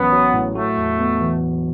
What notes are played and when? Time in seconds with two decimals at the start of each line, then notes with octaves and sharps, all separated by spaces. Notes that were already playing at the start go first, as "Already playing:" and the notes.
Already playing: A1 F#3 B3 C#4
0.12 F#3
0.34 A2
0.55 A3 F#4
0.77 E2
0.99 B3
1.21 E3